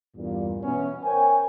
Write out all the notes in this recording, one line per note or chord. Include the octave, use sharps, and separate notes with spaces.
E2 G2 A#2
B2 E3 B3 C#4
A#4 C5 C#5 G5 G#5